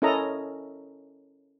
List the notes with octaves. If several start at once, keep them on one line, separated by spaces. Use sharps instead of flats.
C#4 E4 A4 A#4 D#5 A#5